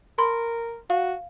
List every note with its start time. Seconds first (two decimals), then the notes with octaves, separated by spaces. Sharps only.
0.19 A#4 B5 C6
0.90 F#4 F5